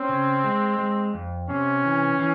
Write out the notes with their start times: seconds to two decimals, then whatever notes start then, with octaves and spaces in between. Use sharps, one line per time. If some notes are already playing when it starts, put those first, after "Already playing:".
Already playing: C4 C#4
0.09 C#3
0.44 G#3
0.79 G#3
1.14 F2
1.49 C3 C#4
1.84 E3
2.19 E3